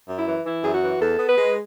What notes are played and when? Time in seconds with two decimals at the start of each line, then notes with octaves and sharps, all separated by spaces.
0.08 F#2
0.17 E4
0.27 E3
0.45 E3 E4
0.64 F#2 G#4
0.73 F#4
0.83 E3
1.01 E2 A4
1.19 B3
1.29 B4
1.38 G#3